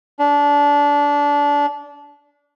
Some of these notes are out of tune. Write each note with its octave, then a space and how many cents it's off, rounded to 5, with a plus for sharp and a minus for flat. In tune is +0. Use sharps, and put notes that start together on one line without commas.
D4 -25